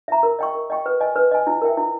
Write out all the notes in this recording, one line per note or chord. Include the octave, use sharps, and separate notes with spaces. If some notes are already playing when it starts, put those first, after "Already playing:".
E5 A#5
A#4
D#5 G5 C#6
A#4
D#5 G5 C#6
B4
D#5 G#5
B4
D#5 G#5
E4
A#4 E5 G5
E4